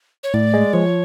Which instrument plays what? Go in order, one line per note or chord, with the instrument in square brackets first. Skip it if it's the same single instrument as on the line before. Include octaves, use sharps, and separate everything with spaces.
[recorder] C#5
[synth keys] A2 [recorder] D5
[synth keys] G#3
[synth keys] F3 [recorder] C#5